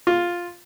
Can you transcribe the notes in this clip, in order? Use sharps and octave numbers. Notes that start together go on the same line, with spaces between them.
F4